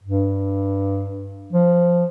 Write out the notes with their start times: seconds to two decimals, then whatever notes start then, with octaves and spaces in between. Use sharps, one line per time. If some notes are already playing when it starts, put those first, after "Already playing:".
0.04 G2
1.53 F3